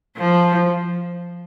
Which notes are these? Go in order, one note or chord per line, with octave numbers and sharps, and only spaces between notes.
F3